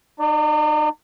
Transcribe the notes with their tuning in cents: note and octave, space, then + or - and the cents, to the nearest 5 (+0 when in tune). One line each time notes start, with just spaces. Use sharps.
D#4 -40 D5 +0